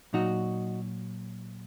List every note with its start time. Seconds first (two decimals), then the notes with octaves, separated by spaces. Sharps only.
0.13 A#2 F#3 D#4 F#4